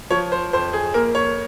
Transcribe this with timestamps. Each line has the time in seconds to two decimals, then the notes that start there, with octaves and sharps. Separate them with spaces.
0.11 F3 C#5
0.32 C5
0.53 F2 C5
0.73 G#4
0.94 A#3 A#4
1.15 C#5